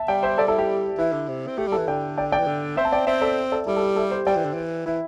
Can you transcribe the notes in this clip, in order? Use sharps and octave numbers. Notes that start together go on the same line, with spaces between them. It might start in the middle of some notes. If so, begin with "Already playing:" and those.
Already playing: E5 A5
G3 D5 G5
C5 E5
A4 D5
E4 A4
G4
E3 E4
D3
C3
C4
A3 G4
G3 E4 A4
E3
D3 D5 G5
D5 G5
D5 G5
E3
D3
C4 C5 E5
A5
D5 G5
C4 C5 E5
A4 D5
A4 D5
G3 E4 A4
A4
G4
E4 A4
G4 C5
G3 D5 G5
E3
D3
E3
E3 E4